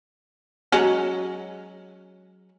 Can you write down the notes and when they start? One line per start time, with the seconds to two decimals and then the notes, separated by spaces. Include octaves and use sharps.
0.72 F#3 G#3 C#4